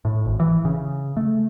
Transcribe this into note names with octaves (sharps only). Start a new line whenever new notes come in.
A2
G#1
E3
C#3
A3